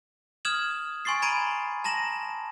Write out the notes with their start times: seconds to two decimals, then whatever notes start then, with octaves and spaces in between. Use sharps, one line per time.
0.45 D#6 F6 G#6 E7 F#7
1.05 G#5 C6 C#6 A6 C7
1.22 A#5 B5 G#6 D7 D#7
1.84 A5 A#5 A#6 E7 F#7